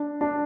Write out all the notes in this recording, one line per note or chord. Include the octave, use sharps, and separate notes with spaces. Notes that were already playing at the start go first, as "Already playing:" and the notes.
Already playing: D4
D4